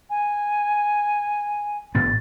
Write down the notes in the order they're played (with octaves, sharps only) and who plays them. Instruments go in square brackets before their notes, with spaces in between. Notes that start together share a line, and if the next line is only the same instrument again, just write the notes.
[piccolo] G#5
[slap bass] A1 A2 B3 [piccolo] A6